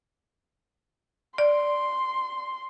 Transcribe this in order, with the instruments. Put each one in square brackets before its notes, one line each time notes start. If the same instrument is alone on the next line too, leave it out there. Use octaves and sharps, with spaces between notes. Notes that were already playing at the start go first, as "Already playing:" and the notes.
[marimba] D5 [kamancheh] C6